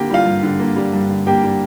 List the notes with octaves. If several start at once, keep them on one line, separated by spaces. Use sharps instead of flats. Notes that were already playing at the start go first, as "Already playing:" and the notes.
Already playing: D3 A#3 G4 G5
G3 F4 F5
G2
D3
A#3
G3
G2
D3
A#3 G4 G5
G3